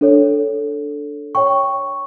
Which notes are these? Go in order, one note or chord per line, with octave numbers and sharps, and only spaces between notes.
D4 A4 C#5
C#5 G5 C#6